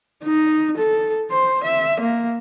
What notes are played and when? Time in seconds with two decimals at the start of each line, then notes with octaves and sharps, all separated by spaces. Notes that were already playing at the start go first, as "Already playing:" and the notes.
0.24 D#4
0.78 A4
1.31 C5
1.64 E5
2.01 A#3